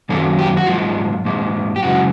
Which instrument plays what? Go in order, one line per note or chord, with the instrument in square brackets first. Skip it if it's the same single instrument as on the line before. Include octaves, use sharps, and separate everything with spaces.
[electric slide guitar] F#2 D#3 F#3 A#3 C#4 A4
G4
F#4
G#2 F3 A#3 F4
G#2 F3 A#3
G4
F#2 C#3 E3 G#3 F#4